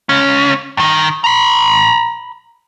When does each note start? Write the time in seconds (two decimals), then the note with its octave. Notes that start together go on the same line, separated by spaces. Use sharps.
0.09 C#2 C#4
0.77 G2 D#3
1.24 A#5 B5